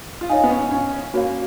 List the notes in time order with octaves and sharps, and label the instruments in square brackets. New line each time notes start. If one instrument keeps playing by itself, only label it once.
[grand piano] F4
[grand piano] D#4 [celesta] C#5 F5 G#5
[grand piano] B3
C#4
C#4
C#4
[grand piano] A#3 [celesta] F#4 C#5 F5